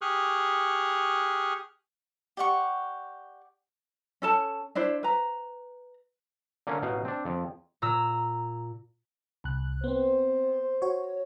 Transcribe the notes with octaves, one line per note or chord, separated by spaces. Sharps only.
G4 G#4 C#6 D#6 F6 F#6
G4 D5 F#5 C#6
C#4 A4 A5
D4 E4 C5 D5
B4 A#5
D3 A#3 C#4
A1 B2 D#4 F5
C4 D4
F2
A#2 A#5 E6
C2 F#6
B3 C4 C5
F#4 C#5